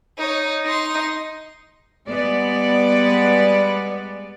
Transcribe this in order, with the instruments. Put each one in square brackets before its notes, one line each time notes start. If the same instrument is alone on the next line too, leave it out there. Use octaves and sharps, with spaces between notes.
[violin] D#4 C#5
D#4 C6
[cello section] G3 G#3 B3 D5